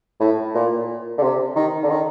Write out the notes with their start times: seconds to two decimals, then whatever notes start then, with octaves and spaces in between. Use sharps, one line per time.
0.20 A2
0.55 A#2
1.18 D3
1.23 C3
1.56 D#3
1.83 D3
1.90 D#3